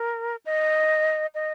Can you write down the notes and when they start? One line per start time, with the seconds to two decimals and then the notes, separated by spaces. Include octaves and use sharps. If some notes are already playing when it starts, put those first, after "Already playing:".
Already playing: A#4
0.46 D#5
1.35 D#5